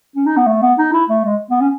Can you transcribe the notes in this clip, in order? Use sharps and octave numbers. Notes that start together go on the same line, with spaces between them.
C#4
D#4
B3
A3
B3
D#4
E4
A3
G#3
B3
C#4